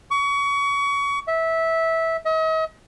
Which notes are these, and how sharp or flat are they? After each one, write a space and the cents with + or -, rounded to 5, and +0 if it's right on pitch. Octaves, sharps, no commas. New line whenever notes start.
C#6 +30
E5 -15
D#5 +45